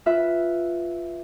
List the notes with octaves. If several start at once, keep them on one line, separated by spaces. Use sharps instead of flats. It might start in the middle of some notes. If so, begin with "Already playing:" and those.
F4 B4 E5